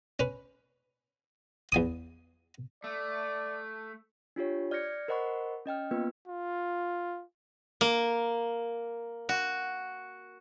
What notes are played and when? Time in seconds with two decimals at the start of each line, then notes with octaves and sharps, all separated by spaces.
0.19 C#4 B4
1.72 E2 G#5 D#6
2.84 A3 D5
4.36 D4 F4 G4 C#5
4.71 D5 F6 G6 G#6 A#6 C#7
5.08 A#4 C5 D#5 F#5 B5 C#6
5.66 C#4 D#5 G5 F6
5.91 A#3 B3 F4 B4
6.28 F4
7.81 A#3
9.29 F#4